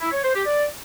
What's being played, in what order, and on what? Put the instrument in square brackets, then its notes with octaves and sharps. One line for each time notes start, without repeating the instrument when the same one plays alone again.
[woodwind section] E4
C#5
C5
G4
D5